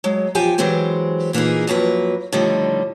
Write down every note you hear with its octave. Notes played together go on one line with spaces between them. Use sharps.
F#3 G#3
E2 F3 G4 G5 G#5
E3 F#3 G#3 C4 G4 C5
A#2 E3 A#3 D#4 G#4
F2 F#3 A#3 B4
A2 D3 D#3 F3 G3 D#4